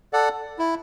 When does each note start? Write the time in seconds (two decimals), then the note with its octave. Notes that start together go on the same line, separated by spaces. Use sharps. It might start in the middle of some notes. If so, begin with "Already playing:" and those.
0.13 A4 D5 F#5
0.59 E4